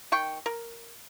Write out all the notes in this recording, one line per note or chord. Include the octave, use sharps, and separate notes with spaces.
D#3 G5 C#6
A#4